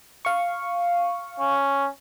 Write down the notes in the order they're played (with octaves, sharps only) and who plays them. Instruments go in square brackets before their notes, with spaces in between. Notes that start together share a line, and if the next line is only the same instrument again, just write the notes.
[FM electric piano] F5 C#6
[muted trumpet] C#4